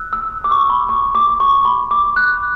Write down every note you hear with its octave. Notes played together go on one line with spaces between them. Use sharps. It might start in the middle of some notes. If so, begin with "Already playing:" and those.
Already playing: E6 F#6
E6
D6
C#6
B5
C#6
D6
C#6
B5
D6
F#6